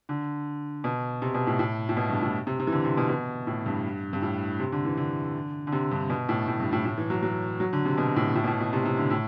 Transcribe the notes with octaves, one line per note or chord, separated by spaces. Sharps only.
D3
B2
C3
B2
A2
A2
A2
B2
G2
A2
C3
C3
E3
D3
C3
B2
B2
A2
G2
G2
A2
C3
D3
E3
D3
D3
C3
G2
B2
A2
A2
G2
A2
A2
E3
F#3
F#3
F#3
D3
C3
B2
A2
A2
B2
A2
B2
C3
C3
D3
A2